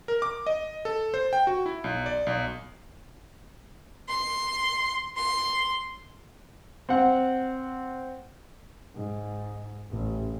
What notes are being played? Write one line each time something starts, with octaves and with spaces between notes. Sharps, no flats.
A#4
D6
D#5
A4
C5
G5
F#4
E4
B1
D5
B1
C6
C6
C4 F#5
G#2
A1